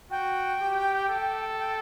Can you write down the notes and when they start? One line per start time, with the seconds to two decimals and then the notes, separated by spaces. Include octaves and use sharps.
0.11 F#4 G5
0.61 G4
1.09 A4
1.59 G5